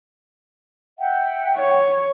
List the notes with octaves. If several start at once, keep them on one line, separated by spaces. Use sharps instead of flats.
E5 F#5 G5
C#5